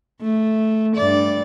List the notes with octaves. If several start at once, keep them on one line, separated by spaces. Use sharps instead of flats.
A3
G2 D5